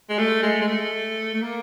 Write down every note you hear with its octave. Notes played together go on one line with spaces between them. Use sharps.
G#3
A3
G#3
G#3
A3
A3
A#3